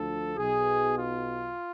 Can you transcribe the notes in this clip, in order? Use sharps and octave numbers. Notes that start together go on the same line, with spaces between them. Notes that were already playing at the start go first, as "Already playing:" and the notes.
Already playing: D2 D3 F3 A4
B1 B2 G#4
F4